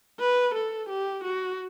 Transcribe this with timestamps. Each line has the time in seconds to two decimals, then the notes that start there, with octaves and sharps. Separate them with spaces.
0.19 B4
0.54 A4
0.89 G4
1.24 F#4